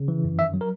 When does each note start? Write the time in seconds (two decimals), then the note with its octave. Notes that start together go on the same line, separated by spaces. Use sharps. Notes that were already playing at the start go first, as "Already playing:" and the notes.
Already playing: C#3
0.08 E3
0.24 F#2
0.39 D#3 E5
0.54 F#3
0.61 A#4